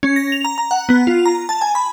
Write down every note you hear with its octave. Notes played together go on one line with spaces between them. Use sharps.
C#4
A#6
F7
A#5
A#5
F#5
B3
F4
A#5
A5
G#5
B5